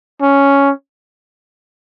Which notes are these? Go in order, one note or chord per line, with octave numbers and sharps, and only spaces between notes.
C#4